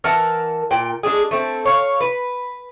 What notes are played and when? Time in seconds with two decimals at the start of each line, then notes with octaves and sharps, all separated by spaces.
0.04 E3 A#4 F#5 A5
0.71 A#2 G5
1.03 G#3 D4 G#4
1.31 A3 C4
1.65 C#5 F5
2.01 B4